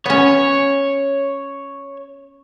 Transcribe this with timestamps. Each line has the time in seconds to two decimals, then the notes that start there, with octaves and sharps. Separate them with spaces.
0.06 B3 C#4 C#5